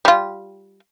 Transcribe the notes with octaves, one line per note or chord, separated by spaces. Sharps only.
G3 F4